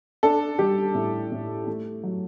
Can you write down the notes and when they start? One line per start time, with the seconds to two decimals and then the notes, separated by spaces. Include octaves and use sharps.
0.23 D4 A4
0.59 G3 G4
0.95 A2
1.32 A2
1.67 A3
2.03 F#3